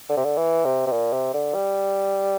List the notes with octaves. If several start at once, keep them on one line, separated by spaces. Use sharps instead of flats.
D3
C3
D3
E3
C3
C3
A#2
C3
D3
G3